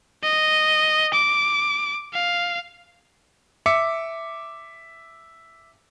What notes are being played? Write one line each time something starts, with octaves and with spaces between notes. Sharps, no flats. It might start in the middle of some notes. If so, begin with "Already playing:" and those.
D#5
D6
F5
E5 D6 C#7